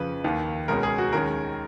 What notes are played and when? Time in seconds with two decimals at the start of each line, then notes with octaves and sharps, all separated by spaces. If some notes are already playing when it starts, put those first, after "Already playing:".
Already playing: F2 C#3 F3 B4
0.24 D#2 D#3 A#3
0.68 C#2 B2 G#3 C#4 A#4
0.83 G#4
0.98 F#4
1.13 D#2 D#3 G#3 C#4 A#4